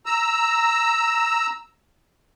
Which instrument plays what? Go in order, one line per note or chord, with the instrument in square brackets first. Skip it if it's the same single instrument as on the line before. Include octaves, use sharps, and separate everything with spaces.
[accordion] A#5 E6